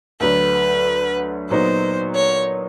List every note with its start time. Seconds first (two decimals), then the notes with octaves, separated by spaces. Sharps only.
0.20 D2 D3 F#3 B4
1.50 A#2 F#3 B3 D#4 C5
2.14 C#5